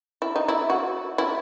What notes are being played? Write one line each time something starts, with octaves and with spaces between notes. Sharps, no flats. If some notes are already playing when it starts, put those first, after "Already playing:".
E4
D#4
E4
F#4
E4